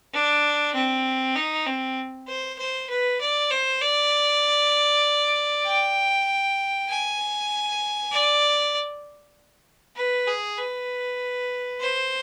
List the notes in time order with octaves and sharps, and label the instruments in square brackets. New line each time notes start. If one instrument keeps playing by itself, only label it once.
[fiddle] D4
C4
D#4
C4
C5
C5
B4
D5
C5
D5
G5
G#5
D5
B4
G#4
B4
C5